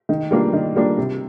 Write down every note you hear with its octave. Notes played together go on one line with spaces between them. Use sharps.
D#3
G3 A#3 D4 F4
D#3
G3 A#3 D4 F4
C3